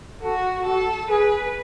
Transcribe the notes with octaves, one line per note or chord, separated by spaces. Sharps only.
F#4 A4
F#4 A4
G#4 B4